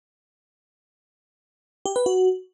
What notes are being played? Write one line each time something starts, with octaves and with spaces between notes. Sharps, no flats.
G4
B4
F#4